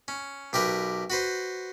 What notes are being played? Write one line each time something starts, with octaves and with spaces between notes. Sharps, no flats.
C#4
B1 G4 A#4 B4
F#4 B4 C5